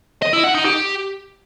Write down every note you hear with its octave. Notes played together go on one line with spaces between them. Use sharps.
D#5
E4
F#5
D#4
G4